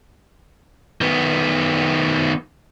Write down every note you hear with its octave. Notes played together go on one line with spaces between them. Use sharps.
D#3 B3